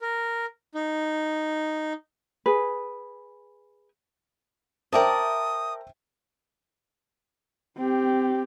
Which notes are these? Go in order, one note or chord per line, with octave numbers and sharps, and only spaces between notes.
A#4
D#4
G#4 B4
A#4 C5 D5 E5 G5 A5 D#6
C4 G4